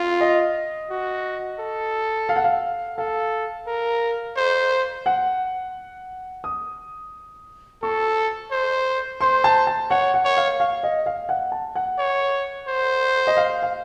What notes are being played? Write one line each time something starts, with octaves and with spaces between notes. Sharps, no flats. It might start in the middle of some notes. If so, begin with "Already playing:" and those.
Already playing: F4
D#5
F#4
A4
F5
F#5
F5
A4 F5
A#4
C5
F#5
D#6
A4 C#6
C5
C5 C6
A5
A5
C#5 F#5
F#5
C#5
F5
F5
D#5
F5
F#5
A5
F#5
C#5
C5
D#5
F5
F5